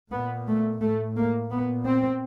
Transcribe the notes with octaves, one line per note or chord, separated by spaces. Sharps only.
A#2 B3
A3
A2 A3
A#3
A#2 B3
C4